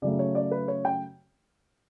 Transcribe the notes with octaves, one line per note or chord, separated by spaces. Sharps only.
C#3 F#3 A3 D5
C#5
D5
B4
C#5
G5